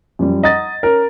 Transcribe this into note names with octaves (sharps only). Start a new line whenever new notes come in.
F#2 F3 G3
D#5 F#5 A#5 A6
C#4 A#4